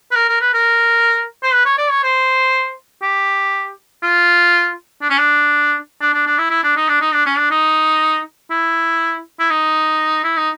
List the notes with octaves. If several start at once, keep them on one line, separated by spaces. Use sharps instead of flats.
B4
A#4
A#4
B4
A#4
C5
B4
C#5
D5
C#5
C5
G4
F4
D4
C#4
D4
D4
D4
D4
E4
E4
D4
D#4
D4
D#4
D4
C#4
D4
D#4
E4
E4
D#4
E4
D#4